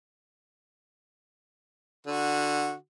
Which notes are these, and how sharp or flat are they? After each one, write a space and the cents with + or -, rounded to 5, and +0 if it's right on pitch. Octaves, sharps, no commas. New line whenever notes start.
D3 +5 F#4 -15